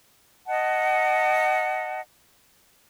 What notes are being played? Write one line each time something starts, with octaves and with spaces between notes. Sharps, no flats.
D#5 F#5 A5